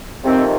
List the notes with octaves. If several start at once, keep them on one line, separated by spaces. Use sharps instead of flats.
F2 C3 D#3 C4